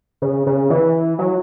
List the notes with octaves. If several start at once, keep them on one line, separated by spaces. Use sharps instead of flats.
C#3
C#3
E3
F#3